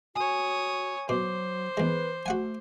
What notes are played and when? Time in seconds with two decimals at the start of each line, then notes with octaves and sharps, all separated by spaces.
0.15 F#4 C#5 G#5 D#6
1.09 B2 F#3 C5 D6
1.77 E2 G#3 B4
2.26 A3 F#4 F#5 G#5